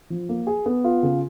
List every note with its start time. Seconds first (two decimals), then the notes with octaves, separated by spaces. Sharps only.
0.10 F3
0.29 A#3
0.47 G#4
0.66 B3
0.84 F4
1.03 C#3